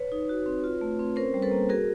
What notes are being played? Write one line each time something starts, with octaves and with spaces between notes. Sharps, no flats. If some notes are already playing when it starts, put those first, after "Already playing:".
Already playing: B4 C#5
D#4
F#4
C4
F4
A3
C4
C#4 A#4 C5
G3
A4 B4
A#3
F#4 G#4 A#4